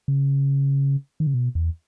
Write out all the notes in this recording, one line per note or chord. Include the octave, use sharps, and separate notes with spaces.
C#3
D#3
C#3
B2
E2